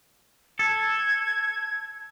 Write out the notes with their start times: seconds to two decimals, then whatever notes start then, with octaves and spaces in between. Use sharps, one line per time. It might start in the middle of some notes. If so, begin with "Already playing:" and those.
0.59 A4 G#6